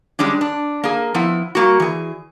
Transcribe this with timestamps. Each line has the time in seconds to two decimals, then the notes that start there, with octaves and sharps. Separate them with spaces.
0.19 G3 G#3 C#4 D4
0.41 D4
0.84 A#3 G#4
1.14 F3 B3 E4
1.55 G3 A#3 F#4
1.80 E3 G#4